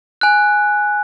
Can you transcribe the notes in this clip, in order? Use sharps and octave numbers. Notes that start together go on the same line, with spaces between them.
G#5 F#6